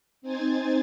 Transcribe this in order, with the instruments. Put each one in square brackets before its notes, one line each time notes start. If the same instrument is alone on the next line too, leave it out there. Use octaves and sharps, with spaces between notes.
[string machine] C4 D#4 C5 G#5 G#6 A6